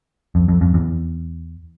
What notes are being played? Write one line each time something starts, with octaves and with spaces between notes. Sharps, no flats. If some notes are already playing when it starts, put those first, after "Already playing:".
F2
F2
F2
E2